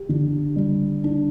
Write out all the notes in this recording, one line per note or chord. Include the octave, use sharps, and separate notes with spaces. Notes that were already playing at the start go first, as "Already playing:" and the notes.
Already playing: G4
D3
G3
D4